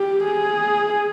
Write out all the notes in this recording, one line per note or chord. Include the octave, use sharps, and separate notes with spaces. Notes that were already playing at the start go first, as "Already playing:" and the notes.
Already playing: G4
G#4